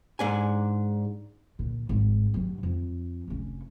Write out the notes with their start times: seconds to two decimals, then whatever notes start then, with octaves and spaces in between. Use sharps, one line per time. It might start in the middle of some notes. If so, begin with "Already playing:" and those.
0.19 G#2 D4 G#5
1.59 A#2 D3
1.89 G#1 G#2
2.34 G2 F#3
2.63 F2
3.28 F1 C#4